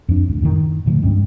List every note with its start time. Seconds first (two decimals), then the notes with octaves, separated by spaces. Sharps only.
0.09 F2 F3 D4
0.28 A1 D2
0.41 F#2 A2 D3 D#3
0.86 A2 D3 F3 A3
1.02 C#2 G2 G#3 C#4